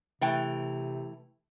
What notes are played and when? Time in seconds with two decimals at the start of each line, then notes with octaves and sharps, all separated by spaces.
0.21 C3 E3 A3 G5